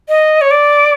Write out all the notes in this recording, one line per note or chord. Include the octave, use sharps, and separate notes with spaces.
D#5
C#5
D5